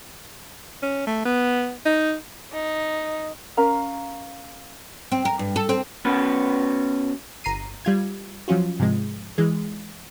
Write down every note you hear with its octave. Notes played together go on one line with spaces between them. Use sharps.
C#4
A3
B3
D#4
D#4
C#4 A#4 F5 A#5
C4
A#4
G2
A4
C4
B3 C#4 F#4 B4
G1 A#5 C7 D#7
G3 F4 G#6
F3 F#3 C#4 F4 F#4
G#2 C3 F3 G#3
E3 G#3